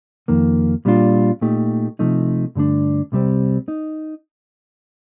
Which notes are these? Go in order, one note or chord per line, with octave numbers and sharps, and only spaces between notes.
F2 D#3 A#3
A#2 G3 D4 F4
A#2 A3 D#4 G4
C3 F3 A3 D#4
G2 D3 A3 D4
C2 C3 G3 C4
D#4